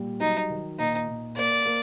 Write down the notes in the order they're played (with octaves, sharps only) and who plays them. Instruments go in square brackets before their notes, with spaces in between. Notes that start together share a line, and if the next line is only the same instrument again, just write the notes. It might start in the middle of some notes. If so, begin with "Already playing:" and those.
Already playing: [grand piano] A#2 G3
[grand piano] F#3 [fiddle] D#4
[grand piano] D#3
[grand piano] A#2 [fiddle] D#4
[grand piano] A#2
[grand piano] A#3 [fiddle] D5
[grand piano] A#3